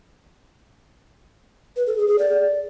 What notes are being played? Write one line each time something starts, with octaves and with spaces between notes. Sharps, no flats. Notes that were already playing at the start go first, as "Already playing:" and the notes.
B4
A4
G#4
G#4
D5